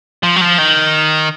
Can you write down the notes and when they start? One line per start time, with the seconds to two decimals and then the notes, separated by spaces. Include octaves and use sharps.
0.23 F3
0.36 F#3
0.41 F3
0.58 D#3